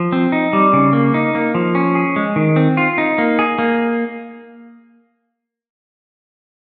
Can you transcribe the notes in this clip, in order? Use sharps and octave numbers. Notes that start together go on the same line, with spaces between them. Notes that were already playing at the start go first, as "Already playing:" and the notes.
Already playing: F3
C4
D#4
G3
C#3
A#3
D#4
A#3
F3
C#4
G#4
G#3
D#3
C4
F4
D#4
A#3
G#4
A#3